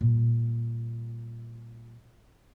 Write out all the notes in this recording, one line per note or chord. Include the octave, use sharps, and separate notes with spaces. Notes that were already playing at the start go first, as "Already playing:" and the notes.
A#2 G3